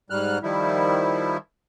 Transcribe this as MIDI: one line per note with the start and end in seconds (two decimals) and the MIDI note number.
0.10 0.38 44
0.10 0.38 55
0.10 0.38 89
0.10 0.38 90
0.43 1.37 51
0.43 1.37 53
0.43 1.37 55
0.43 1.37 64